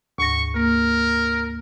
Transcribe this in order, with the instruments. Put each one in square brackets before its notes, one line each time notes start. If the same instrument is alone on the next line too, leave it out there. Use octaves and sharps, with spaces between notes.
[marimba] D2 G#2 A#6 [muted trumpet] C#6
[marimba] A#3 [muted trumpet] A#4